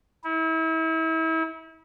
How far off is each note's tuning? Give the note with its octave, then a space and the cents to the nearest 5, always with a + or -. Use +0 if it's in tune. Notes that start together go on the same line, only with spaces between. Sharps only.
E4 -35